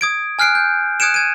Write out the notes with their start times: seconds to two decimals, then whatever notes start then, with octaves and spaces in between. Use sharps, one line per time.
0.01 D#6 G#6 D7
0.39 G#5 F6 F#6 C7 D7
0.55 G6
1.00 D#6 F#6 G#6 C#7 D7 E7
1.14 G#6 D#7